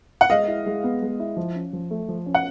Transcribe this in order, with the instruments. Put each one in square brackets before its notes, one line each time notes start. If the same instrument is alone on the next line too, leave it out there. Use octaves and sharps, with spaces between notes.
[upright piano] F#5
[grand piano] G#3 [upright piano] D#5 F5
[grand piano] E4
G#3
B3
G#3
E4
F3
C#4
F3
A3
F3
C#4
[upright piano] F#5